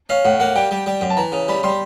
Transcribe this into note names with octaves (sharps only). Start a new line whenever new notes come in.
C#4 F5
A2 F#5
A#3 F#5
G3 G5
G3
G3
F#2
A5
E3 A#5
C#3
G3 B5
G3 C6